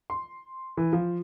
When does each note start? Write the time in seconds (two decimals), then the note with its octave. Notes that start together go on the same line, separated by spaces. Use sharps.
0.10 C6
0.77 E3
0.93 F3